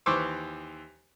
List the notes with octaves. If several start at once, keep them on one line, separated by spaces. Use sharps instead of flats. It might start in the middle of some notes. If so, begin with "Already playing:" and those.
D#2 E3 C5 C#6 D6 E6